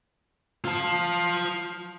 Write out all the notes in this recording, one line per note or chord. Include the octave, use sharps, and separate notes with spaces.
F4 A5